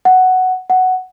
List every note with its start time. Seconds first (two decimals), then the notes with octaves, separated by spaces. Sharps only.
0.05 F#5
0.70 F#5